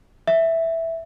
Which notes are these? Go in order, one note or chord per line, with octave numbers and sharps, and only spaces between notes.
E5